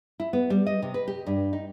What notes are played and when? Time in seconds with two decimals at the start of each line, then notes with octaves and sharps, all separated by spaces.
0.20 E4
0.33 B3
0.50 G3
0.67 D#5
0.82 C3
0.94 B4
1.08 G4
1.27 G2
1.53 D#4